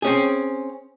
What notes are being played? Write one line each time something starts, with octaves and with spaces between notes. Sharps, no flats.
C4 C#4 G#4